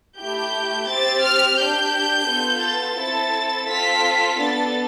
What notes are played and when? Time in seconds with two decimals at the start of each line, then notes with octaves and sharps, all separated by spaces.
0.18 A3 E4 G4 G6
0.87 C4 G4 A6
1.23 F6
1.58 D4 G4 G6
2.28 B3 F4 A4
2.63 A6
2.98 C4 E4 A4
3.68 C4 F4 A4 B6
4.38 B3 D4 A4 A6